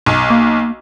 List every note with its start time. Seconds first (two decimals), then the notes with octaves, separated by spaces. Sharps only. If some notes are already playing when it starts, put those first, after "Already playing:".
0.06 B1
0.30 A#3